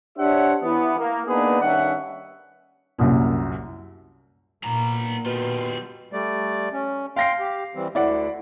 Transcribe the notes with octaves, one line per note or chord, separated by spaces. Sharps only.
D4 G4 C5 C#5 E5 F#5
E3 B3
A#3
A#3 B3 D4 D#4 G#4 B4
G2 D#3 C#4 E5 F#5
C2 F#2 A#2
A#2 B3 A#5
B2 G3 F4
G3 A3 D5
C#4
F5 G5 C6 A#6 C7
G4
E3 G3 C4
D2 D3 E4 D5 F#5